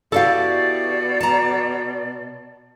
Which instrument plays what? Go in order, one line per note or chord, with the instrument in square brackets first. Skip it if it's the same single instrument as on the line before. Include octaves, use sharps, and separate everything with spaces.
[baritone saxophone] B2 [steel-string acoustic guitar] E4 F#4 G4 [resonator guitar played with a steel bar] A4 F5 [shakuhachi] D5
[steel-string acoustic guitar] A5 A#5